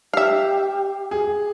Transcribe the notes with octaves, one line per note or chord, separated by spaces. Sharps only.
G4 E5 F5
G#4